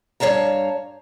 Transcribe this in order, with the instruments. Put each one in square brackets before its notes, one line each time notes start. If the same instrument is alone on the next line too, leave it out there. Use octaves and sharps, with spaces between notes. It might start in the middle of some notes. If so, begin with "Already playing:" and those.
[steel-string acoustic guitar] G2 C#5 F5 A5 A#5